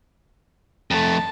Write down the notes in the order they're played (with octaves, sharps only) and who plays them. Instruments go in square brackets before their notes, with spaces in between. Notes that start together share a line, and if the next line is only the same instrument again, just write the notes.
[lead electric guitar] F2 A3 [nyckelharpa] A5